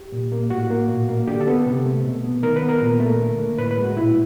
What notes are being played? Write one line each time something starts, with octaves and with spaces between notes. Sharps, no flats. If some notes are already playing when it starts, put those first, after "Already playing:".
Already playing: G4
A#2
A#3
A2 F#4
A#3
A#2
A#3
D3 G4
A4
B3
C3
A3
B2
B3
D#3 A#4
B4
B3
A#4
A#2
A3
D3
A#3
A2 B4
B4
G#3
F#4
A#2 E4